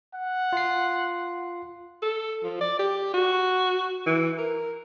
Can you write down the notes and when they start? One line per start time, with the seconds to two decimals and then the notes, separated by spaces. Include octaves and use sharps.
0.14 F#5
0.53 F4 C7
2.02 A4
2.43 F3
2.61 D5
2.79 G4
3.14 F#4
4.06 E3
4.38 A#4